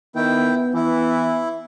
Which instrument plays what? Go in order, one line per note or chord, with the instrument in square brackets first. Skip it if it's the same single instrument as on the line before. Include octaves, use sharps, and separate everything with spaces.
[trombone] D#3 [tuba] B3 [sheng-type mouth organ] E4 G5
[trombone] E3 [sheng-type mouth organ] E4